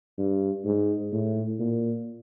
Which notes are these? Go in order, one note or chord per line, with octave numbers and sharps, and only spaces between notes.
G2
G#2
A2
A#2